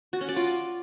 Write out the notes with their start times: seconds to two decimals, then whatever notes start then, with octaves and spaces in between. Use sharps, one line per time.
0.13 F#4
0.21 C#4
0.29 D5
0.36 F4